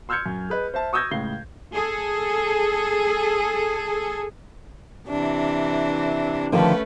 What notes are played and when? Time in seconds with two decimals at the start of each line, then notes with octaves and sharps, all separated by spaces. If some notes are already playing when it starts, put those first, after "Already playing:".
0.09 C6 E6 F6 G6 G#6 C#7
0.26 F#2
0.50 G#4 B4 D#5
0.74 C5 E5 A5
0.93 C#6 D#6 E6 G6 G#6 A#6
1.11 C#2 A2 C#3 C7 G7
1.73 G#4 A4
5.07 C3 E3 D4
6.52 D3 D#3 F3 A3 C#4 B4